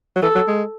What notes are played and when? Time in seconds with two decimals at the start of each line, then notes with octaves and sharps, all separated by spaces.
0.16 F#3
0.22 E3 A4
0.35 F#3
0.48 G#3